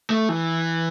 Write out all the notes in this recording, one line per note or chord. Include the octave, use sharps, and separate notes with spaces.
A3
E3